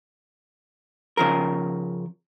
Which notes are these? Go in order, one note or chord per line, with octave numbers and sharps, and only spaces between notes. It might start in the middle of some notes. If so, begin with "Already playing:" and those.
C#3 F3 A#4